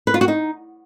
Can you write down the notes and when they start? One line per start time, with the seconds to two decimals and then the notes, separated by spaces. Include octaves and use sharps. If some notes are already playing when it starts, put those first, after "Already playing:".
0.07 B4
0.14 F4
0.21 F#4
0.28 D#4